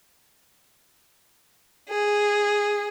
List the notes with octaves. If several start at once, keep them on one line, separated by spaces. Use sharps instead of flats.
G#4